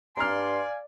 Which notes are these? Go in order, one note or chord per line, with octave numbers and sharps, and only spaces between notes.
G2 D5 F5 G#5 A#5 C6 F6